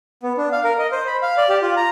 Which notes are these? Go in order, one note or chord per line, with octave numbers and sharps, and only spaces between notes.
B3
D4
F5
A#4
D#5
C5
B5
F5
D5
G4
F4
A#5